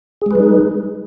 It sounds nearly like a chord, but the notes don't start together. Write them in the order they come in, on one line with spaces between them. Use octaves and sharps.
G#4 G#3 B4 G3 D#4